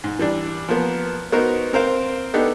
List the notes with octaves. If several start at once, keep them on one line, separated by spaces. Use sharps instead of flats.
G#2
E3 G3 D4
F3 A#3 B3
B3 D#4 F#4 A#4 C5
C4 A#4 C5 F5
B3 D4 D#4 G4 A4